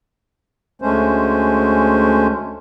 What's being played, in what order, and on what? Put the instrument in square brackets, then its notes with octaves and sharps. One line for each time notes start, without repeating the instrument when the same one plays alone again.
[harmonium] D2 G#3 A3 C#4 C5